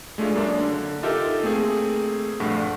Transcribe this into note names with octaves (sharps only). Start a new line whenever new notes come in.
G#3 A3 D4 F4 G#4
F#2 A#3 D4
D3
D#4 F4 G4 A4 A#4 E5
A3 A#3 C4 G#4
A#1 G2 A3 F#5 C#6